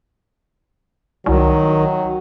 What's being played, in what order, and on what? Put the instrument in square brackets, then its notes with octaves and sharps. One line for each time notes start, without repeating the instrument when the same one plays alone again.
[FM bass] C2 [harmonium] D#3 [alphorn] F#3